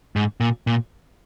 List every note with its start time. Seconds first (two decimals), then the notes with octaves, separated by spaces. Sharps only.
0.16 G#2
0.40 A#2
0.67 A#2